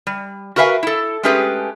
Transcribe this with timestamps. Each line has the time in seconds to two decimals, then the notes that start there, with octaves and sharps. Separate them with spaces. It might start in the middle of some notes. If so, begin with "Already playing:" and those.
0.07 G3
0.56 F#4 A#4 B4 E5 F5 G#5
0.83 E4 A4
1.23 G#3 A3 C#4 G4 G#4 B4